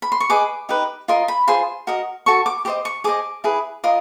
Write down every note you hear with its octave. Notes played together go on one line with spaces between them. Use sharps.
B5
C6
C#6
G#4 B4 D#5 D6
D#4 G4 B4
F4 A#4 D#5 C6
B5
F4 G#4 C5 C6
F#4 A#4 D#5
F#4 A4 C#6
D6
G4 C5 D#5 D6
C#6
G#4 C5 D#5 D6
E4 G#4 B4
F4 A#4 D#5 D#6